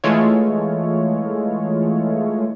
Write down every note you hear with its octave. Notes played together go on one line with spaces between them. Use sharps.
E3 G#3 A3 E4 F4 C#5